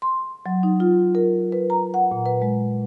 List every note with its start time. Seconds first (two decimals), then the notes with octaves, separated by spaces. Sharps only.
0.02 C6
0.46 F#3
0.63 D#4
0.80 F4
1.15 A#4
1.52 B4
1.70 A#5
1.94 F#5
2.11 A#2
2.26 B4
2.42 G#3